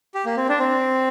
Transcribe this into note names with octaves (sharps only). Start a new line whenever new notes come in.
G4
A#3
C4
D4
C4